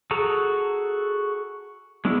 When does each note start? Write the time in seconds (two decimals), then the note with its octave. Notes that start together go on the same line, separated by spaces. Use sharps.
0.11 F#4 G#4 A4 A#5
2.05 G#3 B3 D4 E4 F#4